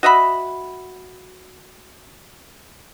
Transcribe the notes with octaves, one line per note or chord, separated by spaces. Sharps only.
F#4 D#5 E5 B5